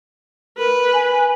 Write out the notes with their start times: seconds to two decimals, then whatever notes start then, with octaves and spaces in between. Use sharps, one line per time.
0.58 A#4 B4
0.93 G#5